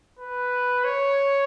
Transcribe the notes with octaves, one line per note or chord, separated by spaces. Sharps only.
B4
C#5